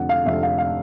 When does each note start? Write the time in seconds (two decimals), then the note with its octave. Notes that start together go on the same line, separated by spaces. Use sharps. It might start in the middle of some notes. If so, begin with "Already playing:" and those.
Already playing: F1 F2 D3 F#5
0.09 F5
0.25 F1 F2 D3 E5
0.43 F5
0.58 F5